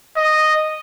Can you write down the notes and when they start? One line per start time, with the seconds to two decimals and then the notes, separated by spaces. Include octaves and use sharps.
0.17 D#5